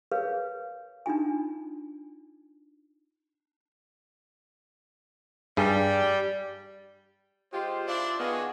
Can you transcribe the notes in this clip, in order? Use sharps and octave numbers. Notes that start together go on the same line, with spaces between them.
G#4 A#4 B4 C#5 F5
D4 D#4 F4 G#5
G2 G3 G#4
G#3 F4 G4 C5
C4 D4 E4 F4 D5
D#3 B3 D4 F#4 G#4 D#5 F5